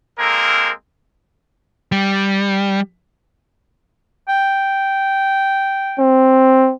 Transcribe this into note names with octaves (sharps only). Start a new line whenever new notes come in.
G#3 A#3 C4 A4 A#4
G3
G5
C4